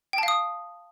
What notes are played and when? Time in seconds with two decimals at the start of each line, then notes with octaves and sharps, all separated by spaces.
0.13 G5
0.18 A5
0.23 F5
0.28 D#6